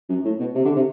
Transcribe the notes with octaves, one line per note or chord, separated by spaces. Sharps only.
F#2
A2
B2
C3
D3
C3